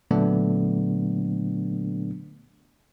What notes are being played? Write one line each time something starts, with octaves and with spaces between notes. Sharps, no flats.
A#2 D3 F#3 A3 B3 D4